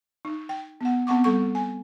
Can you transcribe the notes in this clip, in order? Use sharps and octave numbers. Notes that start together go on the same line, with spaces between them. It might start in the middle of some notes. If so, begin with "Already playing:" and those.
D#4
G5
B3 F#5
B3 C4 F#5 C#6 D6
G3 A4 C#6
G#5